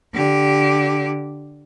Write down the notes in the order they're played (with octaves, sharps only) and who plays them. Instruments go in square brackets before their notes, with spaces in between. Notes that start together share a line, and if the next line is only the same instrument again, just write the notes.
[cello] D3 G4